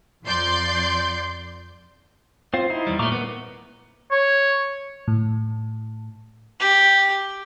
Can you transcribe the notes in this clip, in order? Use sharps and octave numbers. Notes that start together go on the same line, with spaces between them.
F2 F3 D5 C6 G6
C4 F4 C5
D#4 E4
E2 G3
A#2 A3 A#5 C#6 D6
A#3 B3
C#5
A2
G4